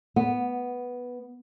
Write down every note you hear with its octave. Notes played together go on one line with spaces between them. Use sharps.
B3